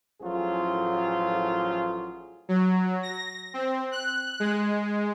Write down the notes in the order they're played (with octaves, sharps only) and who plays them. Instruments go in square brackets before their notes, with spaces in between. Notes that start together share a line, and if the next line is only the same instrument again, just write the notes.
[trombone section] A1 A2 F3 F#3 F4 G#4
[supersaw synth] F#3
A#6
C4
F#6
G#3